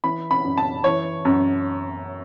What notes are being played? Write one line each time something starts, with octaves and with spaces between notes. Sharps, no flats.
E3 B5
B5
F#2
A5
E3 C#5
F#2